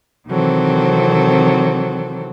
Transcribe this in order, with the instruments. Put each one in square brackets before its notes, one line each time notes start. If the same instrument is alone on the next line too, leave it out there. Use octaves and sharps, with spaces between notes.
[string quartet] C3 D#3 E3 F#3 C4 A4